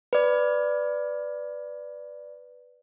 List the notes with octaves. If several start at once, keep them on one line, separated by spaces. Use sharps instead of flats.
B4 D5